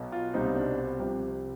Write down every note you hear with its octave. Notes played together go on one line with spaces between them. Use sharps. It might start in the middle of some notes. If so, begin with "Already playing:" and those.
Already playing: B1 B2 B3
F4
C2 B2 G3 C4 D#4
D4
C2 C3 F3 C4 G4